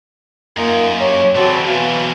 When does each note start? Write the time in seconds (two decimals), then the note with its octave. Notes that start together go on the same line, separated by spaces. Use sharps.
0.57 F#2 A#3 D#4 F4 D#5
1.00 G4 C#5
1.36 C#3 E3 C4 F#4 A4 D5
1.67 B2 E3 F#3 F5